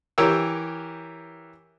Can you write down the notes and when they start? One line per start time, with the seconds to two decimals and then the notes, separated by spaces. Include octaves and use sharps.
0.18 E3 G4 A#4 C#5 G5 E6